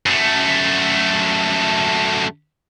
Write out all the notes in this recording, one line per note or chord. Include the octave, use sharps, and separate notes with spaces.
F#2 A3